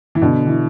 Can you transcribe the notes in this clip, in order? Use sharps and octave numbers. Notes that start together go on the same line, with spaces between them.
E3
B2 D3
E3